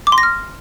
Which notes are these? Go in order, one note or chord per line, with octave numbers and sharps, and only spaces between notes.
D6
C6
A#6
F6